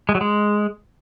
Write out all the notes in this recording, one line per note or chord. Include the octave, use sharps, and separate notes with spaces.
G#3
F#3
G#3